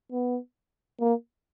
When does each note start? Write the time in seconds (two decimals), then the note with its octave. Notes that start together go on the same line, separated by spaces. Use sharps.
0.12 B3
1.00 A#3